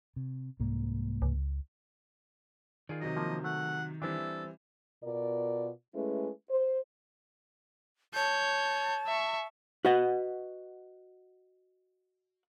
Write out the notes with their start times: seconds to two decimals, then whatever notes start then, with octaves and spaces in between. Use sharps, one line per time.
0.16 C3
0.60 C2 G#2 A#3
1.22 C#2
2.89 D#3 F4 G#4 D5
3.01 C3 F#3 D#5
3.17 F3 A#3
3.44 A3 F#5
4.02 E3 G3 C4 D4 E4 G4 A4
5.04 B2 F4 A#4 D5
5.95 G#3 A3 C#4 E4 B4
6.50 C5
8.14 C#5 A5 G6
9.06 E5 C#6
9.85 F#4 B4 D#5 F#5